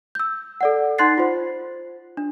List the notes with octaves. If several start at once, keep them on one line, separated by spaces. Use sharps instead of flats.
E6 G6
A4 D5 F#5
D#4 F#5 C6 F#6 A6 C7
F4 C5
D4